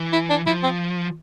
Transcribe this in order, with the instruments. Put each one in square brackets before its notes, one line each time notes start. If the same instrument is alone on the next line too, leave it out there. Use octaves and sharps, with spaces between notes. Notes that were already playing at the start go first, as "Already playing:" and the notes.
Already playing: [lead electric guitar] E3
[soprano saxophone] E4
D4
[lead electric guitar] F3 [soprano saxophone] E4
[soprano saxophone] C4